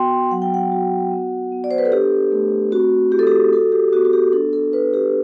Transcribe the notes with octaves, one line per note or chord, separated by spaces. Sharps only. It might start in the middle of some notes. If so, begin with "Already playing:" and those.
Already playing: B3 F#4 G5 C6
F#3 F#5
G5
F#5
F#4
B3
B3
D5
C5
B4
A4
D4 G4
A3
C4 F#4
E4 G4
A4
G4
F#4 A4
G4
B3 F#4
F#4
G4
D4 A4
A4
D4 B4
G4